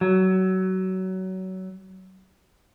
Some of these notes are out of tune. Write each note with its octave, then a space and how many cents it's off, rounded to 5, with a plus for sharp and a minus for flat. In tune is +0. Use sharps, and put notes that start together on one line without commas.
F#3 +25